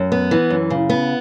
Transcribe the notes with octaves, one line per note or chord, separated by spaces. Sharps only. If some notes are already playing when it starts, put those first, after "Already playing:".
Already playing: F#2
B3
E3
F#2
C#3
B3